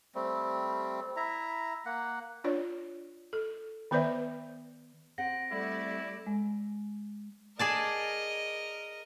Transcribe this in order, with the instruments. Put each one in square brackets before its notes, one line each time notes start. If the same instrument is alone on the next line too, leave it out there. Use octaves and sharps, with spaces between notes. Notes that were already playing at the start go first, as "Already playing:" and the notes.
[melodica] G3 A3 C4
E4 E5 A#5
A#3 F#5
[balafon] D4 F4 C#5 D5
A4
D#3 B3 B4 C5 D5 E5
[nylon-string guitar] C4 G4 F#5 [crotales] A#6 D7
[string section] G3 A3 D5 [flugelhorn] E4
[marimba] G#3
[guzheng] G#4 D5 A5 [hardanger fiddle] A#4 D#5